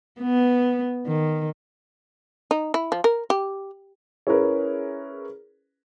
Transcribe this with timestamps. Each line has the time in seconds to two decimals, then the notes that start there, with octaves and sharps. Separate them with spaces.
0.21 B3
1.07 D#3
2.51 D#4
2.74 E4
2.92 F3
3.04 A#4
3.30 G4
4.27 C#4 E4 G#4 A#4 B4